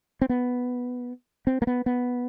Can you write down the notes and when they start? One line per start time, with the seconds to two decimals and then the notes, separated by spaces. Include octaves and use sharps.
0.21 C4
0.29 B3
1.47 C4
1.62 A#3
1.67 B3
1.86 B3